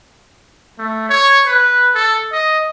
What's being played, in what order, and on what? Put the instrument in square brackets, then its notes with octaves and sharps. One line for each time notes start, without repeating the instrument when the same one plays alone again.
[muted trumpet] A3
C#5
B4
A4
D#5